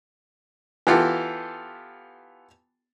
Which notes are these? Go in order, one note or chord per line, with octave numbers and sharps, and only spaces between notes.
E3 B3 F4 G4 A4